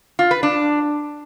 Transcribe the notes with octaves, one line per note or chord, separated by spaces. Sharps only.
F4
B4
D4